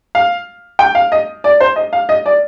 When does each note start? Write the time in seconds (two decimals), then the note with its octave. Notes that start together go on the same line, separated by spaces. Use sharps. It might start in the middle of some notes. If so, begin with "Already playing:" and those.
0.15 F5
0.79 G5
0.95 F5
1.12 D#5
1.44 D5
1.60 C5
1.76 D#5
1.93 F5
2.09 D#5
2.26 D5